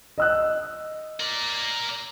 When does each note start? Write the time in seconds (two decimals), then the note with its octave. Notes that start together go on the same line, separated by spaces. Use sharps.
0.18 D#5 E6 F#6
1.20 A#4 D5